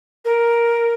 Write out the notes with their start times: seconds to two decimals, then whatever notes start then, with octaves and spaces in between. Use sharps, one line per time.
0.25 A#4